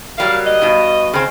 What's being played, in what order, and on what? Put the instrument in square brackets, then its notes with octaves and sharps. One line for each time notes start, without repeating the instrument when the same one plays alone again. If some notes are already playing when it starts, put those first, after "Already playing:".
[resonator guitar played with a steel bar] F#3 G3 A#3 [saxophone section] F5
[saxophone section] D#5
[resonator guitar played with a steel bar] G2 B2
C#3 C4